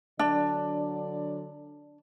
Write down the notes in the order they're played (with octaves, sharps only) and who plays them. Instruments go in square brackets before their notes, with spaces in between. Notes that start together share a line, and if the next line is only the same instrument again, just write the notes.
[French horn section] D3 F#3 D5 [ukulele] D4